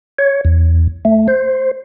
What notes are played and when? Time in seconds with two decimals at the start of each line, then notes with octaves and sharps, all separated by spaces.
0.19 C#5
0.45 E2
1.05 A3
1.28 C5